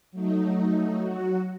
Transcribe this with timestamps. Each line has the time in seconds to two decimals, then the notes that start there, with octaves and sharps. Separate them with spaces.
0.12 F#3 A3 D#4
0.99 F#3 F#4